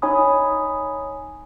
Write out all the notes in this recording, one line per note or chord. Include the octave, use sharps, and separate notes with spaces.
D#4 C#5 G#5 B5 D#6